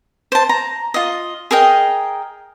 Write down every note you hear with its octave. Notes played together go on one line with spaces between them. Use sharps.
C5 A5
A#5
F4 D#5
G#4 A#4 D#5 G5